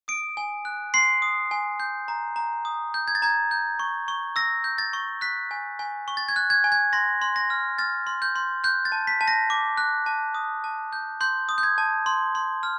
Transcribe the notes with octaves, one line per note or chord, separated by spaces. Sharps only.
D#6 D7
G#5
F#6
C6 C7
D#6
G#5
G6
A#5
A#5
D#6
G6
G#6
A6
A#5 G#6
G6
C#6
C#6
E6 A#6
G6
A6
C#6
F#6 B6
G#5
G#5
C#6
A6
G#6
F#6
G#6
G#5
G#6
C6 A#6
C6
A#6
F6
F6 A6
C6
G6
C6
F#6 G6
A6
A5
B6
A5
A#6
D6
F#6
A5
D#6
A5
G6
C6 G6
D#6
G6
G#6
A5
C6
C6
F6